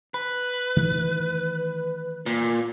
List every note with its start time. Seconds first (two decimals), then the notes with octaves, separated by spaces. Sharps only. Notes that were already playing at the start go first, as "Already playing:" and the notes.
0.14 B4
0.76 D#3 E3 A3
2.26 A#2